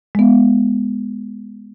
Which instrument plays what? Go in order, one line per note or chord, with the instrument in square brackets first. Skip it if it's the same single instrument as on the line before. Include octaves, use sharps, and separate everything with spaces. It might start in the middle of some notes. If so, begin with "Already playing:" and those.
[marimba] G#3 B3